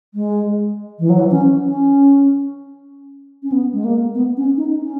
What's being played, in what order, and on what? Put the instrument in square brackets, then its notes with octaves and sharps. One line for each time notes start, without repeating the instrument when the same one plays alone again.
[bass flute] G#3
E3
F#3
E3
C#4
C#4
C#4
B3
G#3
A#3
B3
C#4
D#4
C#4